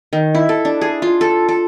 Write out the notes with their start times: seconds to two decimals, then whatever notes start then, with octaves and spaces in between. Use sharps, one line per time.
0.13 D#3
0.35 E4
0.49 A4
0.65 D4
0.81 G#4
1.02 F4
1.21 A4
1.49 A4